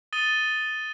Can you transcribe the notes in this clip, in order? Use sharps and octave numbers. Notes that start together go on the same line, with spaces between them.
D#6 A6 D#7 G7